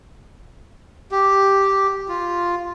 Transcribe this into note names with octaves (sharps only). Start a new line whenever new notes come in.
G4
F4